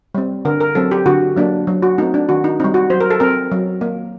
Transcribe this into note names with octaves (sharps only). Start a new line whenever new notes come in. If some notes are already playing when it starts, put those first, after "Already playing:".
G3 C4
D3 A#4
A#4
F#3 C4 A4
G4
D3 F#4
F#3 A#3 D4
F#3
F#4
A3 C4 D#4
D4
D#3 F#4
D#4
G3 C4 D#4
F#4
F#3 C5
A#4
A4
C4 A#4
F#3
A#3